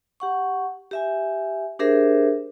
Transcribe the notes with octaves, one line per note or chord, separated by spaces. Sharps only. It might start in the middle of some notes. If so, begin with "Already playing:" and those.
G4 F#5 C#6
G4 E5 G#5
D4 G4 G#4 A#4 C5 E5